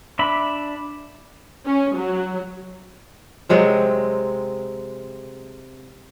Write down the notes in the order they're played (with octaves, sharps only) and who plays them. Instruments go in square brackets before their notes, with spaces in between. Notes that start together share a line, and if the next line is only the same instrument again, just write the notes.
[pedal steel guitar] D4 E5 B5
[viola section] C#4
F#3
[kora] C3 F#3 G#3 C4